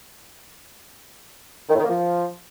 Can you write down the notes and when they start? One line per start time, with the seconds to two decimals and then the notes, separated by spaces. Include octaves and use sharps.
1.69 D#3
1.74 A2
1.79 D#3
1.84 A#3
1.89 F3